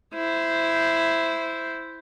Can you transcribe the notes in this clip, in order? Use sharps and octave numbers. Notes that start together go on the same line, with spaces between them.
E4 C5